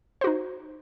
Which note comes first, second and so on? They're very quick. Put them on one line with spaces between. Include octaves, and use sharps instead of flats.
C5 F#4 D#4